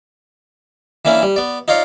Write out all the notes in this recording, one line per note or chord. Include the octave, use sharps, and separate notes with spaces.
E3 A#3 C#4 D4 E4
G3
B3 D5
D#4 F4 C#5 D5 F5